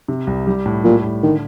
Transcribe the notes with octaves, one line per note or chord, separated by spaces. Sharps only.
C3
C2
G3
A2
A#2 G3
A2
D3 D#3